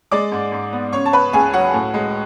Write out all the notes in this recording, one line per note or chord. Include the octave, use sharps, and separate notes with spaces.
G#3 D5 D6
G#2
G#2
B3
C#3 C#5 C#6
A5
C#4 B4 B5
C#2 G#4 G#5
F#3 F#4 F#5
A2
G#3